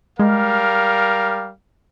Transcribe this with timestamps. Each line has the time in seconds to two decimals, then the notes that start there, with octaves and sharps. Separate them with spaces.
0.19 G3 G#3 A#4 F5